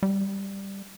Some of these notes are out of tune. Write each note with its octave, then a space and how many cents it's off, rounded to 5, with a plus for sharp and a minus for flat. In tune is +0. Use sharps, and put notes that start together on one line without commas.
G3 +5